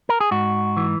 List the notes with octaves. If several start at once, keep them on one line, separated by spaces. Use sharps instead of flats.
A#4
G#4
G#2 F#4
E3